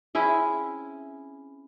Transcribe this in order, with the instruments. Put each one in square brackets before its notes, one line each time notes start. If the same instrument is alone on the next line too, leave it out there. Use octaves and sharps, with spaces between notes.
[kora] C4 C#4 E4 G#4